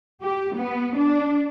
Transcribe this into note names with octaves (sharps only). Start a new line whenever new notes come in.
G4
B3
D4